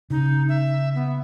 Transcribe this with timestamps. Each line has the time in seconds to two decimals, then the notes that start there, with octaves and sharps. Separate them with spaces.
0.10 C#3 D#4
0.49 E5
0.95 B3